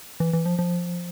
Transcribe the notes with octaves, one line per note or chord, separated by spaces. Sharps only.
E3
E3
F3
F3